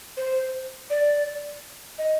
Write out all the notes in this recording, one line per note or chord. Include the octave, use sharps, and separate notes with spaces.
C5
D5
D#5